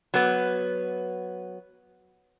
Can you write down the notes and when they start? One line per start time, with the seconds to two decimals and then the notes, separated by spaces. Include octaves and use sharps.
0.14 F#3 B3